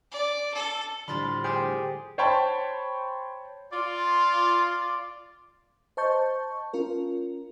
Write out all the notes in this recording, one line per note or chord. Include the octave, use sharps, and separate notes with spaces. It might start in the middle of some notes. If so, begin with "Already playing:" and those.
D5
A4
A2 D3 F3 G3 B5 C6 A6
G4 G#4 C5 G5 G#5 A6
C5 C#5 G5 A5 B5
F4 D5
C5 D#5 A5 C#6 G6
C#4 F4 A#4